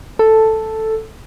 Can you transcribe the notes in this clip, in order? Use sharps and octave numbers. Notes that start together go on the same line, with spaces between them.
A4